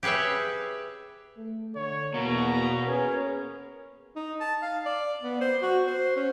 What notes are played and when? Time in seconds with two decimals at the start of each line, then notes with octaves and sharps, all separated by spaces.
0.03 G4 G#4 B4 C#5 E5
1.37 A3
1.76 D3 C#5
2.14 E2 B2 A#3 A#5
2.87 C#4 G#4 A#4 B4 C#5
4.16 D#4
4.40 A5
4.62 F5
4.85 D5
5.22 B3
5.41 C5
5.62 F#4
5.87 C5
6.16 C#4